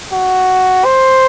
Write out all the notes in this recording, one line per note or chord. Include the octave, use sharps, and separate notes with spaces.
F#4
C5